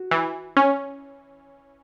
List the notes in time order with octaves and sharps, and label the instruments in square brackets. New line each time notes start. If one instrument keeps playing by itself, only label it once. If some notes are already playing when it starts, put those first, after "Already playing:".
Already playing: [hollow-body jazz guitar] F#4
[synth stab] E3
C#4